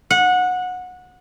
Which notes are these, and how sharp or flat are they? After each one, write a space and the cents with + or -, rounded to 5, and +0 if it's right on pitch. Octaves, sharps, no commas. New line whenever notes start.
F#5 -20